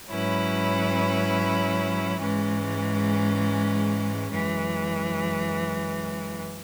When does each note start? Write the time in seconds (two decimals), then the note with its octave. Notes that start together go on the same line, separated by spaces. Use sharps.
0.10 G#2 F#3 C#4 E4 B4
2.20 G#2 E3 G#3 C#4
4.31 F#2 E3 G#3